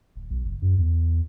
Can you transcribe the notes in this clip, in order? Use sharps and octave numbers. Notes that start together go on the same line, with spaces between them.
D1
B1
F#1
F#2
E2